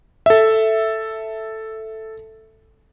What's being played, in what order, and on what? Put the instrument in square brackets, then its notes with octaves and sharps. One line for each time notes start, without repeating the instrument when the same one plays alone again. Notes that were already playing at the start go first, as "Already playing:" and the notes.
[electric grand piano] A4 E5